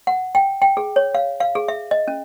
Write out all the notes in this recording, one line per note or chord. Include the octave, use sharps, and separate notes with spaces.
F#5
G5
G5
G#4
C#5
F5
F5
G#4
E5
D#5
C#4